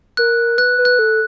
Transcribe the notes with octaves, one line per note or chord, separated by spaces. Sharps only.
A#4 F#6
B4 F#6
B4
F#6
A4